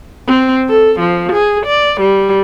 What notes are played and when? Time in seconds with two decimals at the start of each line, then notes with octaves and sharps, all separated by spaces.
0.28 C4
0.69 A4
1.00 F3
1.33 G#4
1.66 D5
2.01 G3